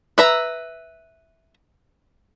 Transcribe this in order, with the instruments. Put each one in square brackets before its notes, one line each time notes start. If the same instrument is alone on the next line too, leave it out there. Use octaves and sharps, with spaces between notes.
[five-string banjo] B4 E5 A#5